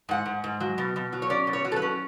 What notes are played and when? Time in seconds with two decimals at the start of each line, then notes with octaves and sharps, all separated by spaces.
0.09 G#2 F#5
0.26 G#2
0.44 G#2
0.60 F#3
0.78 B2
0.96 B2
1.13 F#3
1.22 C#5
1.30 C#4 D5
1.47 B2
1.53 C#5
1.65 F#3
1.72 A4
1.76 B4
1.82 C#4